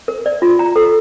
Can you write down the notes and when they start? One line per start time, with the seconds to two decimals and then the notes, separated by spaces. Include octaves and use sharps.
0.08 A#4
0.26 D5
0.42 F4
0.59 A#5
0.76 A4